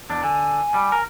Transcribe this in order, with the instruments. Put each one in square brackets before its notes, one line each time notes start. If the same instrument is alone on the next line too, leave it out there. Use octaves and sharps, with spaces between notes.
[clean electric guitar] E2 D4
[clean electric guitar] D3 [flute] G#5
[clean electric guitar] G3
A#4